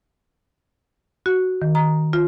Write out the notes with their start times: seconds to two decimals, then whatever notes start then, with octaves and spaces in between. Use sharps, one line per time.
1.26 F#4
1.62 D#3
1.75 A#5
2.13 F4